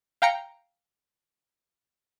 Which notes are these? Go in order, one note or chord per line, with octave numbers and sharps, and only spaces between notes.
F5 G5 A#5 C#7